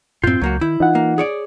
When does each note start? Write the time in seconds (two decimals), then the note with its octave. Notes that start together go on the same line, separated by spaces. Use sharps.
0.24 F#2 A2 C4 F4 G6
0.42 C#2 F#3 A#3 F#4
0.61 D#3 E4
0.80 E3 D#4 F4 F#5
0.95 A#3
1.18 G#4 C#5 D5